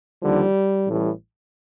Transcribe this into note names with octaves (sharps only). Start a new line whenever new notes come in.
D#2 D3 F3 G3
A1 A2 E3 G3